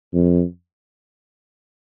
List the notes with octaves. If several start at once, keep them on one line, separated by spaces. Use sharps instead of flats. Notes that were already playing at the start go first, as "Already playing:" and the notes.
F2